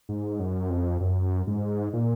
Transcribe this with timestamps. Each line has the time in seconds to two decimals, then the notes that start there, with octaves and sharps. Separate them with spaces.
0.09 G#2
0.39 F#2
0.70 F2
1.01 F#2
1.47 G#2
1.93 A#2